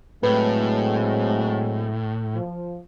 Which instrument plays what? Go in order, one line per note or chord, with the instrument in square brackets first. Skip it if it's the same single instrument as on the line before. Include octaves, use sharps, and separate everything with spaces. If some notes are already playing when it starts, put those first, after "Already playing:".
[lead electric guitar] A2 [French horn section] F#3 G#3 C4 [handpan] B4
[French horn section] F3